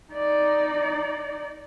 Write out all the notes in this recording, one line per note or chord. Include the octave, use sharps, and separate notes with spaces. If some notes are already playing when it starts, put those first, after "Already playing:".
D#4 D5